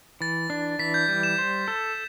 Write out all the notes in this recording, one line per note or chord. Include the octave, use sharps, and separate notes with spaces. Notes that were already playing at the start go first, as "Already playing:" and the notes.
E3 A6
D4
E3 B6
G6
G3
E7
C5
A4